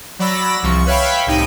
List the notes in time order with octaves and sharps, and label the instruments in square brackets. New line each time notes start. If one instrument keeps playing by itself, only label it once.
[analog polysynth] F#3 D5 B5 E6 A#6
C2 F3 C#6
B4 C#5 E5 F5 G5 B5
C2 A2 D#4 G5 D#7